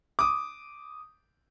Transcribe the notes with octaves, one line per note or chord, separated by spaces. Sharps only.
D6 D#6